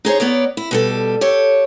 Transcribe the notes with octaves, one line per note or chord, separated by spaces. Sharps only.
D#4 G#4 C5 C#5
B3 A#4 C#5 D5
E4
B2 G3 A4
G4 A4 C#5